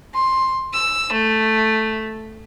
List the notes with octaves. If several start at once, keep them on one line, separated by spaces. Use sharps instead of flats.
C6
E6
A3